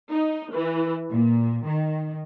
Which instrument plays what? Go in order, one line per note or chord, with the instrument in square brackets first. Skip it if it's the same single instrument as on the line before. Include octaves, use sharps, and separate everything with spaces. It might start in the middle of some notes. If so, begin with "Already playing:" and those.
[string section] D#4
E3
A#2
D#3